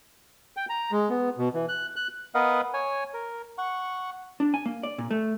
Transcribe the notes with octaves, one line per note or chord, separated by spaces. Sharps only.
G5
A#5
G#3
B3
B2
E3
F#6
F#6
B3 A#4 B4 D#5 F5 F#5
C#5 G#5
A#4
F#5 C#6
D4
G#5
A#3
D5
A#2
A3